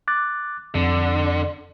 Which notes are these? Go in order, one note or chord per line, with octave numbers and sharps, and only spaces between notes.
D6 F#6 A6
F2 D3